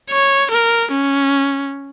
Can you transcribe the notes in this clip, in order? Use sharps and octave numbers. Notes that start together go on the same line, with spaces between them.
C#5
A#4
C#4